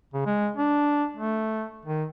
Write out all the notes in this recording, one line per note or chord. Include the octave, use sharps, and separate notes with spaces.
C#3
G#3
D4
A3
D#3